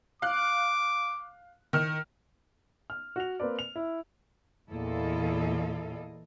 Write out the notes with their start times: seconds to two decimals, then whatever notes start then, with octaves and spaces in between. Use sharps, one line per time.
0.22 F5 D6 F#6
1.73 D#3 F6
2.90 F6
3.16 F#4 F7
3.40 A#3 C4 B4 D5
3.59 F7
3.76 E4
4.71 E2 A#2 E4 A4 D#5 F5